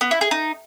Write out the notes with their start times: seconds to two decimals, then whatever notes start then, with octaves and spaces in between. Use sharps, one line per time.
0.01 B3
0.11 E4
0.21 G#4
0.31 D#4